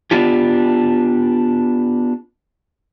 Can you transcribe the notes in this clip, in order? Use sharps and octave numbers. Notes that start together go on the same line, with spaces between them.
B3 D4 F4 G4